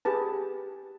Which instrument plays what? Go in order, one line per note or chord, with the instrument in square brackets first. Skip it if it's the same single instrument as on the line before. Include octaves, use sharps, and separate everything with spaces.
[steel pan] G4 G#4 B4 A5